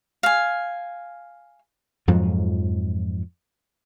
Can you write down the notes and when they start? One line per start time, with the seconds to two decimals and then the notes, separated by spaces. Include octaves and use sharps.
0.23 F5 G#5
2.08 F2 G#2 F3 F#3